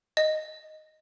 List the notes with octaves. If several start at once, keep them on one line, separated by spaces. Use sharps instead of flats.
D#5